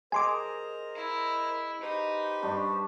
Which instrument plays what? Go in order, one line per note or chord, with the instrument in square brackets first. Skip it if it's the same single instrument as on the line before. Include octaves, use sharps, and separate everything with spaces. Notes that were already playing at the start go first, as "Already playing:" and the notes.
[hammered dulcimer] G#4 D#5 [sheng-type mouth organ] A#4 C5 A#5 [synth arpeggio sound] G#5 C6 D6
[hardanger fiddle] E4
[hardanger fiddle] D#4 [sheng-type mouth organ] G4 B4 C5
[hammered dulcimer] G2 D4 C#6